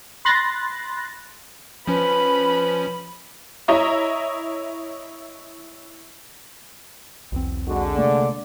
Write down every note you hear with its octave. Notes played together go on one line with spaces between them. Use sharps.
B5 C6 F#6 A6 A#6
F3 C#4 B4 B5
E4 C#5 D#5 E5 A#5
B1 E2 C4
D3 G#3 F#4
C3 A3 A#3 D5